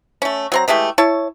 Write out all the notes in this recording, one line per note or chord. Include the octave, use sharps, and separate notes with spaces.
A3 C#4
F#3 C4 A#5
E3 G#3 A3 G4
E4 C#5 A5